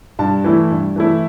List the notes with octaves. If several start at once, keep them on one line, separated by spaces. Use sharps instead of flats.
G2 A5
E3 A3 E4
G2
E3 A3 E4